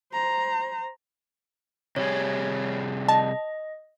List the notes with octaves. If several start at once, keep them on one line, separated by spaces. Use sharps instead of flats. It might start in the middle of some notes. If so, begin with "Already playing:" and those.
C5 A#5
C3 G3 G#4 C#5
D#5 A5